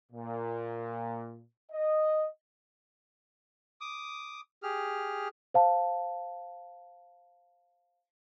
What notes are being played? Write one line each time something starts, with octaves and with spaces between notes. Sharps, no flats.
A#2
D#5
D6 D#6
G4 G#4 F6
C5 F5 A5